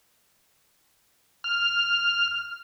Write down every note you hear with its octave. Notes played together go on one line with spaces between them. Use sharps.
F6